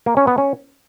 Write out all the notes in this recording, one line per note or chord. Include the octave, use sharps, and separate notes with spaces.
A#3
C#4
B3
C#4